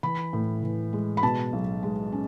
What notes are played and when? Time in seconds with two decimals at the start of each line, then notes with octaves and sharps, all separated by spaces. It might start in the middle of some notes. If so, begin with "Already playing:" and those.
0.03 E3 B5
0.33 A2
0.63 E3
0.93 G#3
1.17 B5
1.23 B2 A5
1.53 B1
1.83 G#3
2.12 C#4